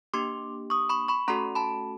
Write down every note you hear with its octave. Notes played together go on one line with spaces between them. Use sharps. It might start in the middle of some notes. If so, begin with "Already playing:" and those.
A#3 D4 G4 C6 D6
C#6 D#6
B5 C#6
B5 C#6
A3 C#4 F#4 A4 A#5 C6
A5 B5